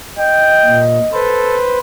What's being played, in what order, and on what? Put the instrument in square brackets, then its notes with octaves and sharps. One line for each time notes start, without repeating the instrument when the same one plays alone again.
[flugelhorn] D#5 [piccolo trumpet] G5
[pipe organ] A#2
[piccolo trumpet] A4 [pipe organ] B4 C5